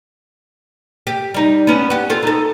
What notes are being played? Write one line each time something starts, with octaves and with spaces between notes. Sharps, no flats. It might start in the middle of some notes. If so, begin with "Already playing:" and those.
G4
G3 D#4
B3 C#4
F#4 G4
F4 A4 C5
D#4 A4